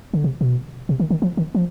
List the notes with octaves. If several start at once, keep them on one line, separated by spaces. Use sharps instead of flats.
D3
C3
B2
C3
D#3
D#3
F3
D#3
F3